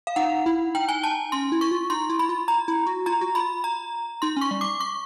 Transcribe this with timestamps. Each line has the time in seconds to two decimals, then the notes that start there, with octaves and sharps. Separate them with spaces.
0.07 F5
0.16 D#4 F#5
0.46 E4
0.75 D#4 G5
0.89 G#5
1.03 A5
1.32 C#4 C6
1.52 E4
1.61 C#6
1.71 F4
1.90 D#4 C6
2.10 E4
2.19 B5
2.29 F4
2.48 A#5
2.68 E4
2.87 F#4
3.06 F4 A#5
3.21 F#4
3.35 F4 B5
3.64 A#5
4.22 D#4 C6
4.36 C#4 C#6
4.51 G3
4.61 D6
4.80 C#6